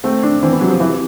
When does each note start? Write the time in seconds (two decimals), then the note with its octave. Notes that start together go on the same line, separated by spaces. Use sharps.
0.04 A3 C4
0.23 D4
0.42 E3 C4
0.52 B3
0.61 C3 F#3
0.70 F3
0.80 C3 E3